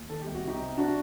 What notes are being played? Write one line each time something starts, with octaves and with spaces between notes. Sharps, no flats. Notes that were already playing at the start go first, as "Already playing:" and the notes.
Already playing: D#2
D#3 A4
C2 G4
F#4
C3 D#4 G4
C3
D4 F#4